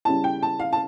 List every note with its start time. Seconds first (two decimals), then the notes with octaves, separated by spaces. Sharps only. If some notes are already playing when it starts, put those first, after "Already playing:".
0.05 C#3 G3 C#4 E4 A5
0.24 G5
0.43 A5
0.60 F5
0.73 A5